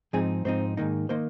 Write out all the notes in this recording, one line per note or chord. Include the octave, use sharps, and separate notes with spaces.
G#2 F3 C4 D#4 G#4
G#2 F3 C4 D#4 C5
G#2 D#3 A#3 D#4
D#3 A#3 D#4 C5